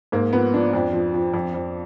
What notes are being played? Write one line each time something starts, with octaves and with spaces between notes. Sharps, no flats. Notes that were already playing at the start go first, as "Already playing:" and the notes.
G#2 A#3
F3 B3
F3 D4
F2
F3
F3
F2
F2